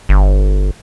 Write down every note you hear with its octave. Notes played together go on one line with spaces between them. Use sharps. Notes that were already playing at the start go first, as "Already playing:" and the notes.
G1